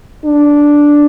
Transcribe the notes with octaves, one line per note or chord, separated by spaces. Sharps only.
D4